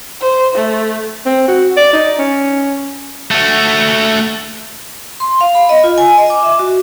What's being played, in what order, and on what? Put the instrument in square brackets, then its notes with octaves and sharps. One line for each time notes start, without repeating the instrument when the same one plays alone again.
[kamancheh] C5
A3
[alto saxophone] C4
F#4
D5
D#4
C#4
[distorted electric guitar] A3 F#4
[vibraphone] C6
F5
B5
D#5
F4
G#5
D#5
D6
E5
F#4